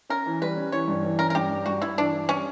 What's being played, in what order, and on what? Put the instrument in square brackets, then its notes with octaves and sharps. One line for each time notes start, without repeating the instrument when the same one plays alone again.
[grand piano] C#4 [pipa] A#4
[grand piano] E3
[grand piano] G3 [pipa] B4
[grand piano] C#4
[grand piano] E3 [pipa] C#5
[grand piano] G2
E3
[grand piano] C#4 [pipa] A#4
[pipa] A#4
[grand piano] G2 [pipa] G4
[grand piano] G2
[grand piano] G2 [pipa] F#4
[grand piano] G2 [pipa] E4
[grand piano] E3 [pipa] D4
[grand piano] E3
[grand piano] G3 [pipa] C#4